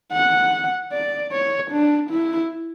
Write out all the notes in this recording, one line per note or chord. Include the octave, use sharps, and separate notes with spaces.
F#5
D5
C#5
D4
E4